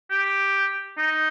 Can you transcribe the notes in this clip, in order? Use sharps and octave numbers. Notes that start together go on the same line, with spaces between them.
G4
D#4